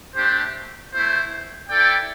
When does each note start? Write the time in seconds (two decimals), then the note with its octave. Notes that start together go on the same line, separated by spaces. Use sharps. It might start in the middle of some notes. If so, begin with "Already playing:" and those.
0.15 A3 D4 G4 C5
0.92 A3 E4 C5
1.69 E4 A4 D5 G5